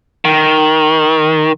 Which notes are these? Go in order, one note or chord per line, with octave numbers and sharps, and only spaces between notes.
D#3